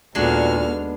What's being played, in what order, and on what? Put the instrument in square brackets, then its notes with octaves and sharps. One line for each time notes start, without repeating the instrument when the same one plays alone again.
[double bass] D#2 B3 [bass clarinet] A#2 [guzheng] G#3 D4 [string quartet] F#4 A4 F6